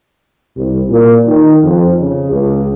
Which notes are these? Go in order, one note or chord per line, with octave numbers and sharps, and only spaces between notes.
C2
A#2
D#3
F2
C#3
C#2